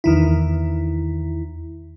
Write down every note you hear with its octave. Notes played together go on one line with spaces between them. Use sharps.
E2 D#3 E4